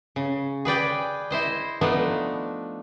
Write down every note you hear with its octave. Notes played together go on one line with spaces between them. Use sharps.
C#3
G#4 B4 D5 G5
E4 C5 D#5
F3 A3 B3 D4 D#4